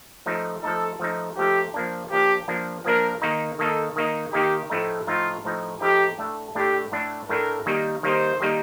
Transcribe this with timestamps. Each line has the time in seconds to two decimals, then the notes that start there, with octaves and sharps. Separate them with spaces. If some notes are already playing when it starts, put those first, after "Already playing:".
0.26 F3 A3 D#4
0.62 F3 A3 D#4 A4
0.99 F3 A3 D#4
1.37 F3 A3 D#4 G4
1.74 F3 A#3 D4
2.11 F3 A#3 D4 G4
2.48 F3 A#3 D4
2.85 F3 A#3 D4 A#4
3.22 D#3 A#3 D#4
3.59 D#3 A#3 D#4 A4
3.96 D#3 A#3 D#4
4.32 D#3 A#3 D#4 G4
4.70 A2 F3 A3 D#4
5.07 A2 F3 A3 D#4 F4
5.45 A2 F3 A3 D#4
5.81 A2 F3 A3 D#4 G4
6.18 A2 A3 D4
6.55 A2 A3 D4 G4
6.92 A2 A3 D4
7.29 A2 A3 D4 A#4
7.66 D#3 G3 A#3 D#4
8.03 D#3 G3 A#3 D#4 C5
8.40 D#3 G3 A#3 D#4